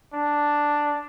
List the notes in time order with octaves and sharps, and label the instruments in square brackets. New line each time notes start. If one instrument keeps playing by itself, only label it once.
[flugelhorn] D4